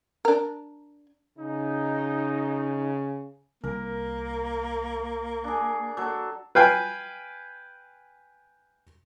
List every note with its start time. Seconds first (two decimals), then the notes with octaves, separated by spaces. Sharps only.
0.25 D4 A#4
1.38 C#3 D#4
3.64 C2 A#3 A#4
5.44 D4 G#4
5.97 F#3 A4
6.55 B4 F5 G5 G#5